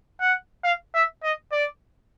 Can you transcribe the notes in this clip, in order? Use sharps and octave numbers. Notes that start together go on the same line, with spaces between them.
F#5
F5
E5
D#5
D5